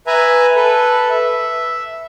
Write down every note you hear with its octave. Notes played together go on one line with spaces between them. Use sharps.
B4 E5 G#5 A#5
A4 B4
E5